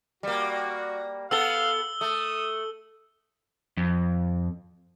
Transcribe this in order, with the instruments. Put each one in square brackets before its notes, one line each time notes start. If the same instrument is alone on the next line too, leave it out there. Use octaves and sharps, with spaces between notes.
[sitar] G3 A#3 [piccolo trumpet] F#4
[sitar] B3 A4 [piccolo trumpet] F5 [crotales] E6 G7
[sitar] A3 [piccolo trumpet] D#6
[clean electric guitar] F2